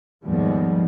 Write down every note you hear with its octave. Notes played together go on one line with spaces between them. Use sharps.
D#2 G#2 F3 G3 G#3 B3